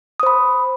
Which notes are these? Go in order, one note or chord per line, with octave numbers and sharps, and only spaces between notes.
C5 B5 D#6